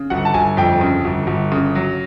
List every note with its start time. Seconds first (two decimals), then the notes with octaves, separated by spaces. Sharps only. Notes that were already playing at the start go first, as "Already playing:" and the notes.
Already playing: C#3
0.10 G1 F#5
0.25 A5
0.34 G1 G#5
0.57 F2 G5
0.81 C#3
1.05 G1
1.27 G1
1.52 C#3
1.75 F#3